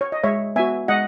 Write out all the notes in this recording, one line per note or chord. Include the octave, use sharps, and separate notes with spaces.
C#5
D#5
G#3 C#5 E5
B3 F#4 E5 G#5
G#3 D#5 F#5